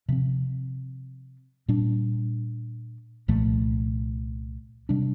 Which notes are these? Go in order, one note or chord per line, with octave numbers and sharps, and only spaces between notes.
C3 F3 C4
A#2 G3 D4
C2 A#2 F3 A3
C3 G3 D4